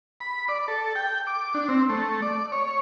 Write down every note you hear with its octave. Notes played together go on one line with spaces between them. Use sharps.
B5
D5
A4
G5
D6
D4
C4
A3
D5
C#5